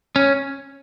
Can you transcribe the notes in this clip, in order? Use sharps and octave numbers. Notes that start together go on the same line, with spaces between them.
C#4